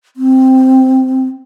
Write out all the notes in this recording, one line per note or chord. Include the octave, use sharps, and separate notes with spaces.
C4